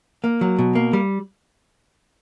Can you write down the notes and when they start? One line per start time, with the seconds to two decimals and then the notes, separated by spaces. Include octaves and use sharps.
0.24 A#3
0.41 F#3
0.59 B2
0.75 A#3
0.93 G3